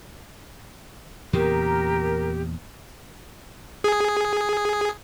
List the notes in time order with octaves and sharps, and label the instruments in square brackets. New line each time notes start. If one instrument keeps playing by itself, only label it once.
[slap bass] E2 A#2 C#3 [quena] G4 [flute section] A#4
[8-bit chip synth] G#4